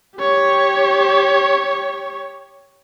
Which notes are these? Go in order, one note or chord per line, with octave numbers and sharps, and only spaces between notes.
G4 C#5